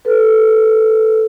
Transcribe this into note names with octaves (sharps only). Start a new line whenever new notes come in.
A4 B4